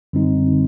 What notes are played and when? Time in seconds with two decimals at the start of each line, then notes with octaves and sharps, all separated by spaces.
0.13 F#2 D3 G3 C4 D#4
0.51 D3